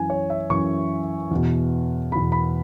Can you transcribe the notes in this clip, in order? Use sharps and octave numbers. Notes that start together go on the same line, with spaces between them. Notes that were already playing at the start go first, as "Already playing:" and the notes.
Already playing: F#2 E3 G#5
C#5
E5
F#2 E3 C#6
E2 B2
E2 B2 B5
B5